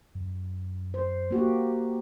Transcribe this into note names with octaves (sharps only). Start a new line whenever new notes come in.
F#2
C5
A#3 F#4 G4